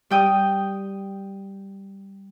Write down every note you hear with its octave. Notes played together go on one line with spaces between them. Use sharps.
G3 G5 D#6